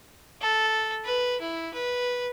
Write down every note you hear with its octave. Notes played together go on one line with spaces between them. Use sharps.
A4
B4
E4
B4